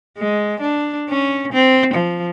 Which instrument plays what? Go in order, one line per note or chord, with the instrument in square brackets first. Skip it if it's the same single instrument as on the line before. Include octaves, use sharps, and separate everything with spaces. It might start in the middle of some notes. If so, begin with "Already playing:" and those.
[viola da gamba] G#3
D4
C#4
C4
F3